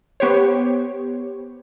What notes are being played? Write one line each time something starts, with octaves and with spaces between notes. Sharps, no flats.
B3 G4 C5 C#5